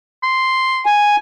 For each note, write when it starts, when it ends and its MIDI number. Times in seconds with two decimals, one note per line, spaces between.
0.23 0.85 84
0.86 1.16 80